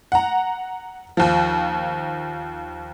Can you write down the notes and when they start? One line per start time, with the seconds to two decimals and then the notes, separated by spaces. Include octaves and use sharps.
0.12 F#5 A#5
1.17 D#2 F3